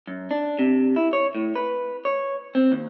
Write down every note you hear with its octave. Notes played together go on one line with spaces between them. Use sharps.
F#2
D4
C3
E4
C#5
A2
B4
C#5
C4
D#2